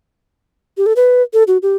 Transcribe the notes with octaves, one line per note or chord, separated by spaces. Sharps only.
G4
A4
B4
A4
F#4
G4